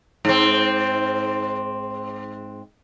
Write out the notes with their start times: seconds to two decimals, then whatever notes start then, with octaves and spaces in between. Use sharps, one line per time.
0.25 G#2 C4